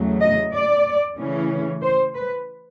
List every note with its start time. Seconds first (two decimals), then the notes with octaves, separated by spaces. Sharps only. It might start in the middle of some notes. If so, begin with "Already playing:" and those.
Already playing: E2 C#3 F#3 A3
0.22 D#5
0.54 D5
1.19 C#3 E3 A3 C#4
1.83 C5
2.15 B4